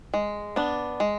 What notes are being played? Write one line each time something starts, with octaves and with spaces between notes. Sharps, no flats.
G#3
B3 D4
G#3